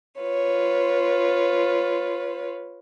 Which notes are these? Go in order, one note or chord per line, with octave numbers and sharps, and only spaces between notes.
F4 B4 C#5